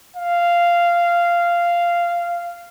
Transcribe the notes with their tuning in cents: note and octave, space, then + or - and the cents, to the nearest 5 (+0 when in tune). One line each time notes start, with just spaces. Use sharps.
F5 -10